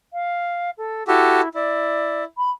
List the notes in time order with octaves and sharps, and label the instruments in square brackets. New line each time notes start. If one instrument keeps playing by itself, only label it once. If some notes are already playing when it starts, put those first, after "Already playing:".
[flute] F5
A4
[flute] E4 [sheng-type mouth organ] F#4 G4 A4
[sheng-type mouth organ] E4 [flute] D5
[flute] B5